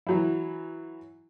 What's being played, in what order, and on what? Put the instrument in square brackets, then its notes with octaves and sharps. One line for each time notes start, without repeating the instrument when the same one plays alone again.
[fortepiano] E3 F#3 E4